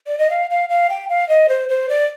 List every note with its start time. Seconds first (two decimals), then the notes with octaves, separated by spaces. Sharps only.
0.07 D5
0.19 D#5
0.30 F5
0.50 F5
0.69 F5
0.90 G5
1.09 F5
1.29 D#5
1.49 C5
1.69 C5
1.89 D5